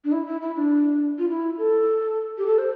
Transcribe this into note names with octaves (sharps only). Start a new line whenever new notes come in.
D4
E4
E4
E4
D4
F4
E4
A4
G4
A4
C5